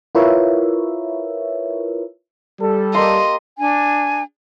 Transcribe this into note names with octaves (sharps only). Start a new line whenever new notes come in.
E4 F4 A#4 B4 C#5 E5
G3 A4
A#3 G4 D#5 C6
D4 G#5